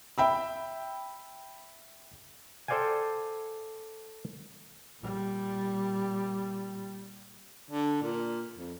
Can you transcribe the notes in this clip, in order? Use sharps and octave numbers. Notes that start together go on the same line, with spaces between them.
E5 G5 B5 E6
A4 C5 D5 F5 G5 G#5
A#2 G3
D3
A#2
F2